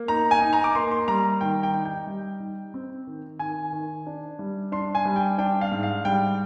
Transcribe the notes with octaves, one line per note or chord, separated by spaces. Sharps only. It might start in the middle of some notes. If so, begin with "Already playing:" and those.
Already playing: A#3
D#4 A#5
G#5
D#4
A#5
D6
A#3 C6
C6
G3 A#5
D#3 G5
G5
D#4
G5
G3
D#4
C4
D#3
D#3 G#5
D#3
D4
G3
D4 C6
G#5
G3
G5
D4 G5
F5
G#2
F5
G3 G5